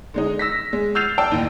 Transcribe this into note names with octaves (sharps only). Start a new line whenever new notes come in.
D3 G#3 D#4
E6 A#6 B6
G#3
E6 F6 G6 A6 C7 F7
D5 G5 A5 E6
A1 D#2